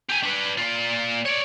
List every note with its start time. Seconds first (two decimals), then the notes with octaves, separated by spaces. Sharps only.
0.09 G4 G#5
0.23 D4 B4
0.58 A#2 F4
1.25 C#5 D5